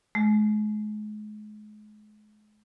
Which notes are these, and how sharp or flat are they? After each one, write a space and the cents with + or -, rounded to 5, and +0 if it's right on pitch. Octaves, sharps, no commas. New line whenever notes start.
G#3 +35